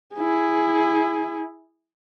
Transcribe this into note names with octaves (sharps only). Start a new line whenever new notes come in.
E4 G#4